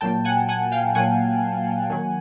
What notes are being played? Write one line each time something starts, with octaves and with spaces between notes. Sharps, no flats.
A#2 F#3 A#3 G5 A5
F#5 G#5
F#5 G#5
F5 G5
A#2 F#3 A#3 F#5 G#5
D#3 F#3 A#3